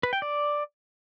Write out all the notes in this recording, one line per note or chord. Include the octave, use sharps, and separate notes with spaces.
B4
G5
D5